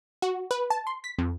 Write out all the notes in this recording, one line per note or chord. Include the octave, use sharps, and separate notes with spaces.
F#4
B4
A5
C6
B6
F2